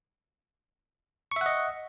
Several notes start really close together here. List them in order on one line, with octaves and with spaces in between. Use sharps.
C#6 E5 F#5 D#5